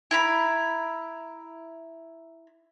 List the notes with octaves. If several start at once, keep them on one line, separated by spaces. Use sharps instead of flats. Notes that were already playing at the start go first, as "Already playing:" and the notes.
E4 A#5 B5